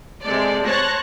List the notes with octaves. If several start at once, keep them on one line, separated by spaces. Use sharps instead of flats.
C3 G#3 A4 D5
C5 C#5 A5 C#6 F#6 A#6